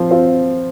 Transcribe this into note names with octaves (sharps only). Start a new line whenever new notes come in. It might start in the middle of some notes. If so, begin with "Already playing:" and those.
Already playing: F3 C4 F4
C4 F4